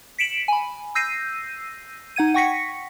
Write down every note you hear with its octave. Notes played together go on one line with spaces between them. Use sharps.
B6 C#7 D7 E7 F#7
G#5 B5
E6 G6 A#6 C7 D#7
D#4 F#5 G#6 D#7
F#5 G5 C#6 A#6 B6 C#7